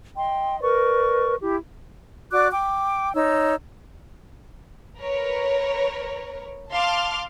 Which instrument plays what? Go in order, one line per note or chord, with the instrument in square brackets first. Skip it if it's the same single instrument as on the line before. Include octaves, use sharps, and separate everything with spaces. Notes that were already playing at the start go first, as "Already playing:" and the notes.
[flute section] D#5 G5 C6
A#4 B4 D5 C#6
E4 G4
F#4 D5 D6 F#6
G5 D6
D#4 C#5 E6
[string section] A#4 B4 C#5
F5 A5 C6 D6 F6